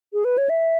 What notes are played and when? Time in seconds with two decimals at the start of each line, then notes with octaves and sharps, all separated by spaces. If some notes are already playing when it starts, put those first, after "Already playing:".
0.13 G#4
0.25 B4
0.38 C#5
0.49 E5